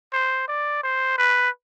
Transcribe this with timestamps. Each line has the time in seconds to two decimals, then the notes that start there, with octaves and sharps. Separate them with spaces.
0.13 C5
0.48 D5
0.83 C5
1.18 B4